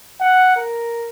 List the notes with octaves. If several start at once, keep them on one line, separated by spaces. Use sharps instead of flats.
F#5
A#4